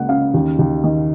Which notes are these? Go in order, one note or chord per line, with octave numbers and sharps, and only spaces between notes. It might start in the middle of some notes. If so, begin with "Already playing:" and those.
Already playing: C#2 A#3 F#5
C#3 F5
D#2
D#2
D#3